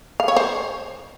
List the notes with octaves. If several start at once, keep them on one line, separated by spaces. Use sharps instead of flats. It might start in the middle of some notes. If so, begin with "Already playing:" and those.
F5
C#5
C5